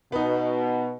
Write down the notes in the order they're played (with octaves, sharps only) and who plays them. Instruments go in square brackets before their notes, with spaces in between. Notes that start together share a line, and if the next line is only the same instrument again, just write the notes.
[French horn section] B2 [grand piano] B3 D#4